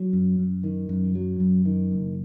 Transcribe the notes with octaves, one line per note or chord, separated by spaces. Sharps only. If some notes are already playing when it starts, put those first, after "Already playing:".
Already playing: F#3
F#2
F#2
D#3
F#2
F#3
F#2
D#3
F#1